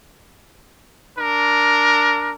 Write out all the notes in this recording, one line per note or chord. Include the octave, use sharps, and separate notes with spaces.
D4 A#4